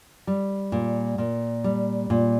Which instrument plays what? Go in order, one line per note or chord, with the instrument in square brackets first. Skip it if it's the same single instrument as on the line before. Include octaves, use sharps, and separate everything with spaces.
[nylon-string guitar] G3
A#2
A#2
G3
A#2